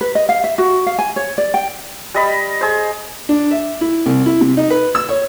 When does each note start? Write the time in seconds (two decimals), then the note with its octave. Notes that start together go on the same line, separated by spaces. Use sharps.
0.01 B4
0.15 D#5
0.29 F5
0.44 E5
0.58 F#4
0.87 F5
0.99 G#5
1.16 C#5
1.38 D5
1.54 G5
2.14 G3 D#5 B5
2.61 G#4 C5
3.29 D4
3.51 E5
3.81 E4
4.06 C2
4.26 E4
4.41 C3
4.57 D#4
4.70 B4
4.95 E6
5.09 C#5